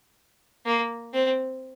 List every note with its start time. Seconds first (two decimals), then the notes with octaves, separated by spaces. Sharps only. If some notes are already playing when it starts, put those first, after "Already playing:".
0.66 A#3
1.14 C4